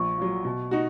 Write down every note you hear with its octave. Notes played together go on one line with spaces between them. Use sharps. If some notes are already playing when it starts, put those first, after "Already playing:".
Already playing: A#1 C#6
A#2 F#3
B2
D#4 F#4